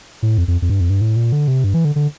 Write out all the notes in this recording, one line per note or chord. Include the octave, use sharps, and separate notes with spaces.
A2
F2
F2
F2
G2
F2
G2
A2
A#2
D3
C3
G2
E3
D3
D3